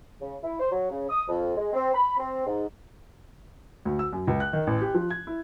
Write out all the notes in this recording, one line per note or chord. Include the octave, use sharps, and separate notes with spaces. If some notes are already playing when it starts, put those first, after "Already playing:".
C#3
E4
C5
F#3
C#3
D#6
F2
G#3
C4
B5
C4
G#2
D2
E6
F#2
C#2
F#6
D#3
A1
G4
F3
G#6
E4